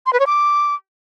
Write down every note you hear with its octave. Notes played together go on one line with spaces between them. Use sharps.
C6
B4
C#5
D6